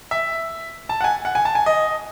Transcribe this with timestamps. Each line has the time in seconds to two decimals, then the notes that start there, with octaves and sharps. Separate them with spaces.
0.11 E5
0.89 A5
1.01 F#5
1.04 G#5
1.25 F#5
1.35 G#5
1.45 A5
1.55 G#5
1.66 D#5